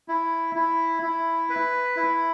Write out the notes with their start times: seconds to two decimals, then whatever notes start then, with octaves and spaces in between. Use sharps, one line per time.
0.08 E4
0.55 E4
1.02 E4
1.50 B4
1.96 E4